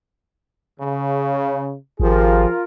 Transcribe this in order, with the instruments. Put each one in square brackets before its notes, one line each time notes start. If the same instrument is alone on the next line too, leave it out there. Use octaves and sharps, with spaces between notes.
[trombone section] C#3
[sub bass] G#1 [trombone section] F3 G4 G#4 [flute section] F4 A#4